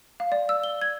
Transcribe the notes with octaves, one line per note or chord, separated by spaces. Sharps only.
F5
D5
E6
G7
G#6